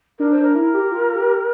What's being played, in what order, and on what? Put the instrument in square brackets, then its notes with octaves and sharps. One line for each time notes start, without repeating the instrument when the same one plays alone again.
[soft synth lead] D4 [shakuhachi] A#4
[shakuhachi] C5
[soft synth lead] D4 [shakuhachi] A#4
[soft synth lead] E4
G4
F4
G4